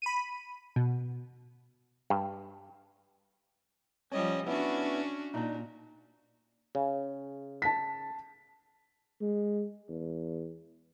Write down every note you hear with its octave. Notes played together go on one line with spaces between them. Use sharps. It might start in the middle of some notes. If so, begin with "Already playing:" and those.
B5 D#7
B2
G2
F3 G3 C#4 D#5
B3 C#4 D4 E4 F#4
A#2 D4 D#4
C#3
A5 B6
G#3
E2